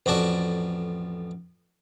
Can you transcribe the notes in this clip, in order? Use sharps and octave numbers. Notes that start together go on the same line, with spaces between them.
A1 F2 F#4 D5 A5